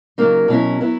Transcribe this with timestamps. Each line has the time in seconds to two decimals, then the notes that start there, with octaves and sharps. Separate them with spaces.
0.18 C#3 F#3 A#3 D#4
0.48 B2 F#3 C#4 E4
0.81 F#3 B3 E4